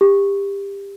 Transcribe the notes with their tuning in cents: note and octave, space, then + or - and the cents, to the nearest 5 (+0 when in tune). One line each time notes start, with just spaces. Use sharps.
G4 +20